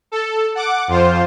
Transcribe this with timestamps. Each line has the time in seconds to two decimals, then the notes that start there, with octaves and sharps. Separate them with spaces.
0.12 A4
0.55 F#5 D6
0.88 F2 F4 C5